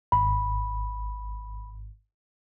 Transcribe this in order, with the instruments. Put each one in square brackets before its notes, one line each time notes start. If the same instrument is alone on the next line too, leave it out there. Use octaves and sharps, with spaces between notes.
[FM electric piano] G#1 [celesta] B5